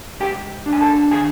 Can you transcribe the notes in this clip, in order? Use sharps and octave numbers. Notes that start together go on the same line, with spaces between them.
G#2 G4 G5
D4
G#5
A4 A5
D#3 G#4 G#5